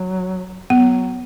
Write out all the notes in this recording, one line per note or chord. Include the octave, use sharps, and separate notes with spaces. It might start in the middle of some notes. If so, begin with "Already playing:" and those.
Already playing: F#3
F#3 B3